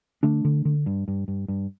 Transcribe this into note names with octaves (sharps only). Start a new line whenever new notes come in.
D3 A3 D4
D3
D3
G2
G2
G2
G2